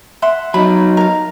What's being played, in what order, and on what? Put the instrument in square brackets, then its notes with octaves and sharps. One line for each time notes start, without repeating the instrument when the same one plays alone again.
[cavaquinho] E5 F#5 C6
[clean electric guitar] F#3 D#4 [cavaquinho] B5
[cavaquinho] A#4 F5